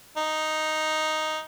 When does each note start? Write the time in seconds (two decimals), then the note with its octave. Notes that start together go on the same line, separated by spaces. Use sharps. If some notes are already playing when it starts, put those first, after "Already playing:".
0.17 D#4